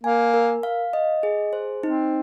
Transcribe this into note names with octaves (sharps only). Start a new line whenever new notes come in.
A#3 G#5
A#4
F5
D#5
G#4
C5
C4 D#4